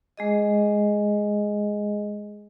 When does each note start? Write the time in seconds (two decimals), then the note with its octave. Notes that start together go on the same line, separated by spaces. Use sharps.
0.17 G#3 G#4 D#5